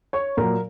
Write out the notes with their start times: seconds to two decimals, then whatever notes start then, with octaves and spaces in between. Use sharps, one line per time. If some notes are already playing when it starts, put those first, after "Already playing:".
0.13 C#5 C#6
0.37 A#2 F#3 A#4 A#5